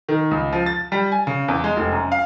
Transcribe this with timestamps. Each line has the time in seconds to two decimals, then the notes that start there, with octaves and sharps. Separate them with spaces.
0.09 D#3
0.31 C#2
0.53 F3
0.66 A6
0.92 G3
1.12 G#5
1.27 C#3
1.48 E2
1.64 G#3
1.77 F1
1.92 F#2
2.12 F5